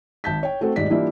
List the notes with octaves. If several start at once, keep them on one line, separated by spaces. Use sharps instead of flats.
G#1 A5 G6 B6
C#5 G5
A3 C4 F#4 A4
D#1 G#2 G3 D5 B6
E3 G3 A#3 D4 E4 F4